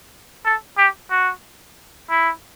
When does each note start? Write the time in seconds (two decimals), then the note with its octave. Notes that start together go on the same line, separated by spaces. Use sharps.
0.45 A4
0.77 G4
1.10 F#4
2.10 E4